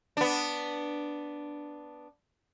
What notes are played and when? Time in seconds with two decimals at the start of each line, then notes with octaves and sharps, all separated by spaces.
0.17 B3 D4